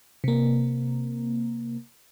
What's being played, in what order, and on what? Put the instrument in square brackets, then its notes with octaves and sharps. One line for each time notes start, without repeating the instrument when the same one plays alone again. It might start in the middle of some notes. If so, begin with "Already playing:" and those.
[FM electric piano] C3 A#3